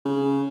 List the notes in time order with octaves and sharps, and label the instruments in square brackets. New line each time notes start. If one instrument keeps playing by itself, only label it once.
[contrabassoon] C#3